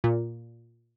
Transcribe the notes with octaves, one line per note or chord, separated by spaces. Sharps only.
A#2